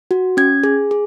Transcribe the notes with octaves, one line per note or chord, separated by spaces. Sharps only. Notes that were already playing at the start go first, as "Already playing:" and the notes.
F#4
C#4 G#6
G#4
G#4